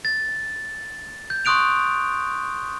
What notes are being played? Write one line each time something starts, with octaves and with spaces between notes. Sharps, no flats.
A6
G6
C6 C#6 D#6 F#6 D7 F7